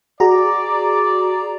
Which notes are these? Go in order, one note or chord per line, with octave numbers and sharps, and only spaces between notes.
F#4 G#4 D5 A#5